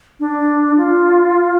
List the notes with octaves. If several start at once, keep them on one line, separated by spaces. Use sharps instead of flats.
D4
F4